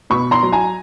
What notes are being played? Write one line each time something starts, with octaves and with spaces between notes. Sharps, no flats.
B2 B5 C#6
A#5 C6
F#3
G#5 A#5